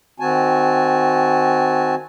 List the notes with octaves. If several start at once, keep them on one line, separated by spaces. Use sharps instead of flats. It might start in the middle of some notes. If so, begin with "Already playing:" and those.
D#3 C4 F#4 G#5 A5